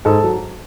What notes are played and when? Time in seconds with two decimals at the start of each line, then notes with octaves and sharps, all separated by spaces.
0.05 G#2 A4
0.24 F#3